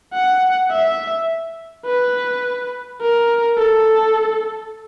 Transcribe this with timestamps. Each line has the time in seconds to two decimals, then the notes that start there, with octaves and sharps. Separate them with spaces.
0.13 F#5
0.70 E5
1.86 B4
3.01 A#4
3.58 A4